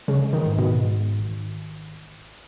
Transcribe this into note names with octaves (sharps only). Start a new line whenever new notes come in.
C#3 G#3
D#3
G#2
B2
G#1
G#1